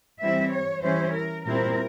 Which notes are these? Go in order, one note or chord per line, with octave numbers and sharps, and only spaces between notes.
E3 G3 C4 E4 E5
C#5
E3 G3 C#4 E4 C5
A#4
A#2 G3 C4 E4 A#4